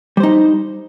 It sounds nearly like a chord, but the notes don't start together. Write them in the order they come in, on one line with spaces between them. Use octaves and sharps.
G3 C5 D#4